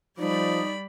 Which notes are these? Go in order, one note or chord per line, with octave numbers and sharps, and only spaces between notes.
F3 G3 D#4 D5 B5